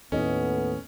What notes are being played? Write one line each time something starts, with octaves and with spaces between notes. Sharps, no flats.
D#2 A2 A3 B3 C#4 D#5